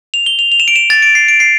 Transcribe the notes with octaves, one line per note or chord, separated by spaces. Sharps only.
F7
G7
F7
F7
E7
D7
E7
A6
D7
C7
D7
C7